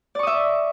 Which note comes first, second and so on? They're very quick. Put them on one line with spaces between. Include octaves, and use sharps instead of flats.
D5 C#6 D#6 E5